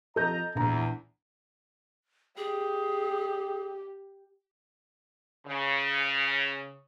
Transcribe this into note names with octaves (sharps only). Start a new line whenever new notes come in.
F2 A4 D#5 A#5 G6
A#1 E2 A#5
G4 G#4
C#3